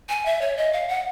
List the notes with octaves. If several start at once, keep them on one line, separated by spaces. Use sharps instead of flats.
G#5
E5
C#5
D#5
F5
F#5